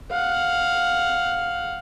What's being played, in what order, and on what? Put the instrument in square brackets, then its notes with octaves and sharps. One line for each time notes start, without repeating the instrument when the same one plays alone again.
[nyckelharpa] F5 F#5